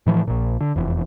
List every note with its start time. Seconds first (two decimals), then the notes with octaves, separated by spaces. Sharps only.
0.06 A2 E3 F3
0.28 A#1 A#2
0.61 D3
0.76 F1 E2